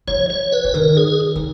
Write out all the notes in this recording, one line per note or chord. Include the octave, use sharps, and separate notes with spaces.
F3 C#5
C#5
B4
F3
D#3 A#4
G#4
D#3